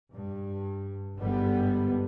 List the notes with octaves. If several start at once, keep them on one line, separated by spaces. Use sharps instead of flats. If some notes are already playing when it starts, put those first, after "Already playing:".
G2
G1 G#2 D3 G3 B3